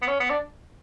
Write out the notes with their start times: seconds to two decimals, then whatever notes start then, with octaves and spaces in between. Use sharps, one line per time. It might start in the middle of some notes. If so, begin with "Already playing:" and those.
0.02 B3
0.08 C#4
0.20 B3
0.30 D4